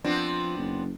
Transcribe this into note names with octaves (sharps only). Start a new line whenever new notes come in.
F3 B3 C4 D4
F#1